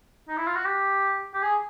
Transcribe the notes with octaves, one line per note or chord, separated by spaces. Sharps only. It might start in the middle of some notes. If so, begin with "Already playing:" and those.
D#4
E4
F4
F#4
G4
G4
G#4